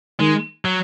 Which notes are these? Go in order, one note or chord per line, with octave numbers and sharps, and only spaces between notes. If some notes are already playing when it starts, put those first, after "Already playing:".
D#3 G#3
F#3